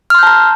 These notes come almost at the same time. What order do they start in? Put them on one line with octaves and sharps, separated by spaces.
F6 C6 G6 A5 A#5